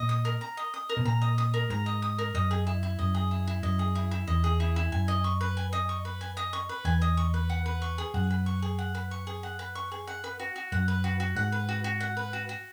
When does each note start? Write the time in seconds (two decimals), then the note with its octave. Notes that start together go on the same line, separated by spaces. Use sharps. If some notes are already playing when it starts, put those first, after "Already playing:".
Already playing: A#2 D#5
0.09 D#6
0.25 A#4
0.41 A#5
0.57 D#5
0.74 D#6
0.89 A#4
0.97 B2
1.05 A#2 A#5
1.22 D#5
1.38 D#6
1.54 A#4
1.70 G#2 A#5
1.86 D#5
2.02 D#6
2.18 A#4
2.34 F#2 D#5
2.51 G#4
2.67 E4
2.83 E4
2.99 F#2 D#5
3.14 G#4
3.31 E4
3.47 E4
3.63 F#2 D#5
3.79 G#4
3.95 E4
4.11 E4
4.27 E2 D#5
4.44 G#4
4.60 E4
4.76 E4
4.92 F#2 G#5
5.08 D#5
5.24 C#6
5.41 B4
5.57 G#5
5.73 D#5
5.89 C#6
6.05 B4
6.21 G#5
6.37 D#5
6.53 C#6
6.69 B4
6.85 E2 G#5
7.02 D#5
7.17 C#6
7.34 B4
7.50 F#5
7.66 B4
7.82 C#6
7.98 G#4
8.14 F#2 F#5
8.30 B4
8.46 C#6
8.62 G#4
8.79 F#5
8.95 B4
9.11 C#6
9.27 G#4
9.43 F#5
9.59 B4
9.75 C#6
9.92 G#4
10.07 F#5
10.24 B4
10.40 F#4
10.56 F#4
10.72 F#2 F#5
10.88 B4
11.04 F#4
11.20 F#4
11.36 G#2 F#5
11.52 B4
11.69 F#4
11.84 F#4
12.00 F#5
12.17 B4
12.33 F#4
12.49 F#4